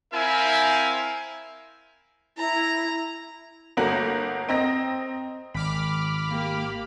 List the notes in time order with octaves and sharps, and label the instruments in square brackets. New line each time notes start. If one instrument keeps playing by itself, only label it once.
[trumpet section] C4 E4 A#4 E5 F5 G#5
[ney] E4 [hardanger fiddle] A#5
[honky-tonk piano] G1 A3 A#3 F#4 A#5 F#7
C4 D#5 A#5 A#6
[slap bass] G#1 [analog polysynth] B5 D6 F6
[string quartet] A#3 G4